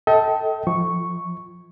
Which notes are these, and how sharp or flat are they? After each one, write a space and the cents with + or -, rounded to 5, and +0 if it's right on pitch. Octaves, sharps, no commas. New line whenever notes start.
A4 +0 D#5 +40 G5 -15
F3 +0 C#6 +0